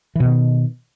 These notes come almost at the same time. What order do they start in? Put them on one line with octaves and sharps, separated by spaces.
E3 B2 D#3